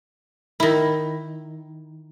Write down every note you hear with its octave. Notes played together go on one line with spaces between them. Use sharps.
D#3 E4